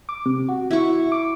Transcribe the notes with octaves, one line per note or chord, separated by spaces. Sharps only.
D6
C3
F#4
E4 C#6
D6